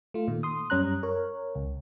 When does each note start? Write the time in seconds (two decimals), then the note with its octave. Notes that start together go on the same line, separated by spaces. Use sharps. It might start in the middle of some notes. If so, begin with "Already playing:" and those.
0.14 A3 F4
0.28 A#2 D#3
0.43 C6 D#6
0.70 F#2 G3 C#4 A#5 F#6
1.03 A#4 C#5
1.55 C#2